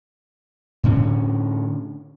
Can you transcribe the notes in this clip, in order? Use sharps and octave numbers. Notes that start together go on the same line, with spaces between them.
A2 D3 C#4